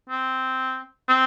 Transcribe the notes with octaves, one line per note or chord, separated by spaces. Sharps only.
C4
C4